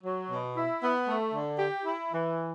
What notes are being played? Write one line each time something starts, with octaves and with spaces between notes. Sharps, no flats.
F#3
B2
E4
B3
A3
D3
G4
E4
E3